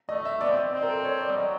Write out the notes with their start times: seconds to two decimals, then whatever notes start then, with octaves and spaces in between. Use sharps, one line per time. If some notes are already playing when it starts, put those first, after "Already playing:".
0.09 A3 D#5
0.25 E5
0.41 B3 D5
0.51 C4
0.57 D5
0.73 C4 D#5
0.83 A#4
0.89 A4
1.05 C#5
1.21 D5
1.31 G3
1.37 F#3 D#5